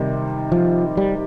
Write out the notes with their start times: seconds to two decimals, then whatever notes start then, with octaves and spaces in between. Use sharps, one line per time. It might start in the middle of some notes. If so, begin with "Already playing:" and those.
Already playing: C3 D#3 G3
0.52 F3
0.97 G3